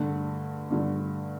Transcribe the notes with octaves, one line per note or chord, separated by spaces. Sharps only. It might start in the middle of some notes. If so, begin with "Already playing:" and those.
Already playing: G2 D3 A3
G2 D3 A3